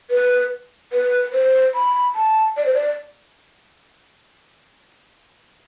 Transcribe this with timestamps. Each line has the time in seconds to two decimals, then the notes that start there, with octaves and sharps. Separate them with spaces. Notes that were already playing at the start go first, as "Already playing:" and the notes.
0.11 B4
0.93 B4
1.33 C5
1.75 B5
2.15 A5
2.57 D5
2.66 C5
2.74 D5